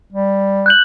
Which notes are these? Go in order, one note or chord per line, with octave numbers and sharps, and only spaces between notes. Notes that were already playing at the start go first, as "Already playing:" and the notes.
G3
F#6 G6 F#7